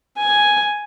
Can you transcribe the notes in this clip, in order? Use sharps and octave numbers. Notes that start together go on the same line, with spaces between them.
G#5